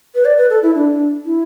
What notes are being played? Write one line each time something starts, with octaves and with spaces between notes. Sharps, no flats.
B4
D5
B4
A4
E4
D4
E4